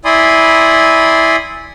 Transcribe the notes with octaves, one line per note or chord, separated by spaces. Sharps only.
E4 D5 G#5 B5 C6 D#6